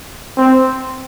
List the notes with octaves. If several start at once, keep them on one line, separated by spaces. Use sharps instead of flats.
C4